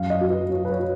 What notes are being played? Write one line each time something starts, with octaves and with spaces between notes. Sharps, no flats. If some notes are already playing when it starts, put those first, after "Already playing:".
Already playing: F#2 F5
D#5
F#3
B4
F#3 C#5
B4
C#5
F#3